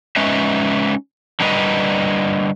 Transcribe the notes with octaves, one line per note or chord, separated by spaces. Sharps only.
G#3 C#4 D#4 B4 E5
D3 G3 A#4 B4 D#5